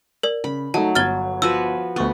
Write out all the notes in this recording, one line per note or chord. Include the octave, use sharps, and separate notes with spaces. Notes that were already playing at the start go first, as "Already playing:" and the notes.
A#4 D5
C#3 B5
F#3 A3 D#4 D#5 A5
G1 F6 G#6 A6 G7
F3 F#4 B4 E6
D2 B3 C#6 A6